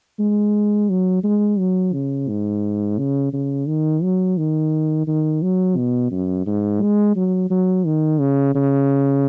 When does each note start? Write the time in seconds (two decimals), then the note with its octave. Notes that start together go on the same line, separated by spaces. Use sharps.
0.19 G#3
0.90 F#3
1.24 G#3
1.59 F#3
1.93 C#3
2.29 G#2
2.98 C#3
3.33 C#3
3.68 D#3
4.03 F#3
4.38 D#3
5.07 D#3
5.42 F#3
5.77 B2
6.11 F#2
6.46 G#2
6.81 G#3
7.16 F#3
7.50 F#3
7.86 D#3
8.20 C#3
8.55 C#3